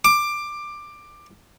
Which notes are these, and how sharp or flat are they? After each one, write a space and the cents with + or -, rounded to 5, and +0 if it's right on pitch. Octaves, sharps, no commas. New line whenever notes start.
D6 +15